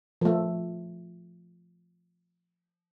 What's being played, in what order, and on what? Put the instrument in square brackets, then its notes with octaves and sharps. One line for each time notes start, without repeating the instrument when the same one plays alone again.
[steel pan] F3 A3